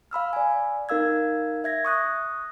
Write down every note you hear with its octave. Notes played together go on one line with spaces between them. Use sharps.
F5 B5 E6 F6
D5 G#5
D#4 A#4 F5 E6 G#6
E5 G#6 A#6
C#6 D#6 F#6 A#6